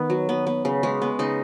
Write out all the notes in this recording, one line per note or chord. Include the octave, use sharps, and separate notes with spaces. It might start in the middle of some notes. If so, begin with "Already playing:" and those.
Already playing: D#3 B3
F#3
B3
B3
C#3
G#3 C#4
B3
C#3 D#4